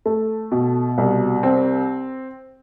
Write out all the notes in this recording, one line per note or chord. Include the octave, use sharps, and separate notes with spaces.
A3
B2
C2
C4